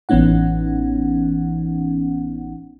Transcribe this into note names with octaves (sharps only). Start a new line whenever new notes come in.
A1 E3 B3 C#4 D#4 F#5